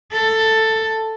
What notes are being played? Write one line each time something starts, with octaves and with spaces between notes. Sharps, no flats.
A4